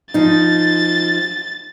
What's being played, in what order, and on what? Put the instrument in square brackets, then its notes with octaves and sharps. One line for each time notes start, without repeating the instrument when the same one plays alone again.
[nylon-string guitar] F3 D#4 [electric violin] A6